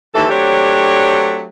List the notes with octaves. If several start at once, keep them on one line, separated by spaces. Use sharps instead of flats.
D#2 E3 A4
F#3 A3 C4 D4 G4 C#5